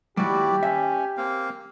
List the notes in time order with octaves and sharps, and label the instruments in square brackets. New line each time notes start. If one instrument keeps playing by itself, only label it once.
[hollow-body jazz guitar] D#2 G3 [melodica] E4 F#4 D5 [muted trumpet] G4
[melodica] C#4 [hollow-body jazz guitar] E5
[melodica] A#3 C4 F5